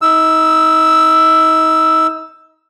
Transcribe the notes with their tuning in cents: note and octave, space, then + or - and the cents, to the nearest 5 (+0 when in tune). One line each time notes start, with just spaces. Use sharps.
D#4 +35 E6 +0